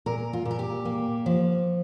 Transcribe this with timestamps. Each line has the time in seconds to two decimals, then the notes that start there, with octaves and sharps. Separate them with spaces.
0.06 A#2 A#4
0.33 F4
0.45 A#2
0.51 A#4
0.59 G4
0.85 A#3
1.26 F3